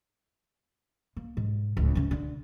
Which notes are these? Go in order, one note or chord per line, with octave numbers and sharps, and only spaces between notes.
A#3
G#2
D1 C#2
D2 C#3
D3